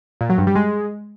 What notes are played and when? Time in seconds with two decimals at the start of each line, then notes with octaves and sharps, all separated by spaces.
0.21 A#2
0.29 F#3
0.38 G2
0.47 G3
0.56 G#3